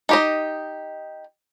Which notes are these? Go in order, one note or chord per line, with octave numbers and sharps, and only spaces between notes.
D#4 G4 D#5